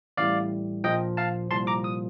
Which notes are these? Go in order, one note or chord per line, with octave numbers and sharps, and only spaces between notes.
A1 A2 G3 D5 F5
A#1 A#2 F3 D#5 G5
F5 A5
C2 A#2 F3 A5 C6
A#5 D6
D#6